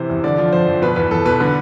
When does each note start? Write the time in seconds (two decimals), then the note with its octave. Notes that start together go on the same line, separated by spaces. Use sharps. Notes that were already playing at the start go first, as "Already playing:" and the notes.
Already playing: C3 E3 C5
0.10 E2
0.24 D3 D5
0.38 F3
0.53 F2 C5
0.67 F2
0.82 B2 B4
0.96 E2 B4
1.11 E2 A4
1.26 B2 B4
1.40 D3